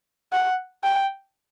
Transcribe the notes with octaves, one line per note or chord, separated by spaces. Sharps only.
F#5
G5